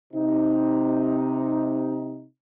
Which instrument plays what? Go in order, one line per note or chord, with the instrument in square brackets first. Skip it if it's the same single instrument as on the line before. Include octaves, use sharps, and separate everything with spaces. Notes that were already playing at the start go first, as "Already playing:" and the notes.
[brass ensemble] C3 D#4